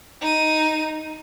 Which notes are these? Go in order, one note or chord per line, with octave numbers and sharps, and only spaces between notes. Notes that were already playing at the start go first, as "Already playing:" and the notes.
D#4 D#7